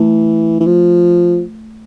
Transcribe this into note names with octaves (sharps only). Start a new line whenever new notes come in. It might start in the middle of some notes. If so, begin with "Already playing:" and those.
Already playing: E3 A3
E3
F3